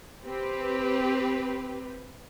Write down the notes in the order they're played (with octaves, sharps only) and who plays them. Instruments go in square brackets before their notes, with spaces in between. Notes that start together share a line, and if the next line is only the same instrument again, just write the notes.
[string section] C4 G4 B4